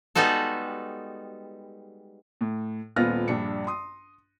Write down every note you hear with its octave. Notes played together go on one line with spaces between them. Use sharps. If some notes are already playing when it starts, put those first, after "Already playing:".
G3 G#3 B3 D#4 F#4 A4
A2
D#1 A#2 B3 F4 F6 A#6
A#1 G2 D4 C#7
C6 D#6